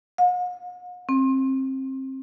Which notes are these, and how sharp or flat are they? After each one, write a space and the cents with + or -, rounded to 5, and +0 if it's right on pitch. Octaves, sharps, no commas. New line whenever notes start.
F#5 -45
C4 +25